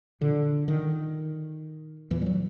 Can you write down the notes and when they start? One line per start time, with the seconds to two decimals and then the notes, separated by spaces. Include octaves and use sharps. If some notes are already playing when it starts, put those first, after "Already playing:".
0.21 A#2 D3
0.68 D#3
2.11 E2 A#2 E3
2.22 G3
2.26 F#3